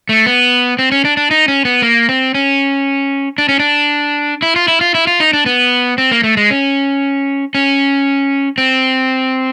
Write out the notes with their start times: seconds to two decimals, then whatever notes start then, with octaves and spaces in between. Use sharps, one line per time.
0.09 A3
0.26 B3
0.79 C4
0.92 C#4
1.05 D4
1.17 D4
1.31 D#4
1.48 C#4
1.65 B3
1.82 A#3
2.09 C4
2.34 C#4
3.38 D4
3.49 C#4
3.59 D4
4.42 E4
4.56 F4
4.68 E4
4.81 F4
4.95 E4
5.07 F4
5.20 D#4
5.33 D4
5.46 B3
5.98 C4
6.11 A#3
6.23 A3
6.37 G#3
6.50 C#4
7.55 C#4
8.58 C4